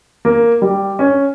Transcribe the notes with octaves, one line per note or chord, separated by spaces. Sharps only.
A#3
G3
C#4